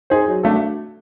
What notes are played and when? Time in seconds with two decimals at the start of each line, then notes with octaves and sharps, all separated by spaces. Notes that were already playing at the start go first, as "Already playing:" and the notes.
0.10 D#4 G#4 C5
0.28 F#3
0.43 A3 D4 F#4 A4